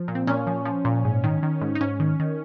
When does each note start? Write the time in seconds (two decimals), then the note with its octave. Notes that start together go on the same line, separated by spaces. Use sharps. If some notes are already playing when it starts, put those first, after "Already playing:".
Already playing: F3
0.08 A#2
0.15 C4
0.27 A#2 C#4
0.47 F3
0.65 F3
0.85 A#2
1.05 G#2
1.24 D#3
1.43 D#3
1.61 G#2
1.75 D#4
1.81 G#2 C#4
2.00 D#3
2.20 D#3